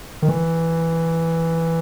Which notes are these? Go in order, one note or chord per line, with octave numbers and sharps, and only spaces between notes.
D#3
E3